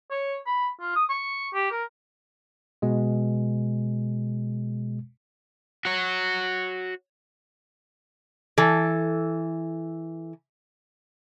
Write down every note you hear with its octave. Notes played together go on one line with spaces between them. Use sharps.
C#5
B5
F4
D#6
C#6
G4
A#4
B2 G#3
F#4 C#5
E3 A4